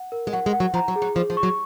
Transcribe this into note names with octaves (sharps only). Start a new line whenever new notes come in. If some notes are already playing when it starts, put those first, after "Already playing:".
Already playing: F#5
A#4
G#3
F#3 F#5
G#3
F#5
F#3
F3 A#5
F#3
G#4
F#3
F3 G#4
F3
C#6
F#3